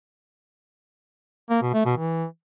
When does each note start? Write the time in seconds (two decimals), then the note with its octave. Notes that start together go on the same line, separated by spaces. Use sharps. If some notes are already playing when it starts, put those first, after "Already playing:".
1.50 A#3
1.62 B2
1.74 A3
1.85 B2
1.97 E3